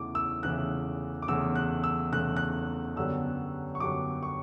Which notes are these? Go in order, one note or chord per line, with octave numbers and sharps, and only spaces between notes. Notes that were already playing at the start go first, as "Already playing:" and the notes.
Already playing: E2 C#3 E3 A3 D6
E6
E2 C#3 E3 A3 F#6
D6
E2 C#3 E3 A3 E6
F#6
E6
E2 C#3 E3 A3 F#6
F#6
F#2 D3 G3 B3 E6
C#6
F#2 D3 G3 B3 D6
C#6